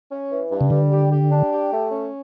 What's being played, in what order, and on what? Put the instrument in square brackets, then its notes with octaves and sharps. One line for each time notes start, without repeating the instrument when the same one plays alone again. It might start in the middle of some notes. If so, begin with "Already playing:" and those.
[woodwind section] C#4
E3
G2
[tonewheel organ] C#3
[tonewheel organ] D3 [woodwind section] G3
[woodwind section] G4
G4
D4
G4
A3
C#4